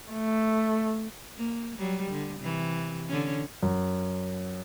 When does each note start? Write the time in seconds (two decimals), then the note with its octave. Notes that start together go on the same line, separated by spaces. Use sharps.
0.13 A3
1.37 A#3
1.78 F#3 G3
2.11 D3
2.40 C3 E3
3.09 D3 C#4
3.63 F#2